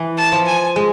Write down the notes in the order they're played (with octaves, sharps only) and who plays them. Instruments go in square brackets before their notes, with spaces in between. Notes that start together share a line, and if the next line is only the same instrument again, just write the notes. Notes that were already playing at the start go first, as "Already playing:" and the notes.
Already playing: [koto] E3
[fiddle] A5
[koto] F3
[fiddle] G#5
[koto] G#3